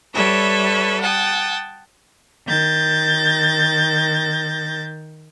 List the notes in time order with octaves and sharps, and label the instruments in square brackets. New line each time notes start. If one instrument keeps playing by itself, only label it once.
[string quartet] G3 A4 B4 C#5 E5
F#5 G5 A5 D#6
D#3 G6 A6 A#6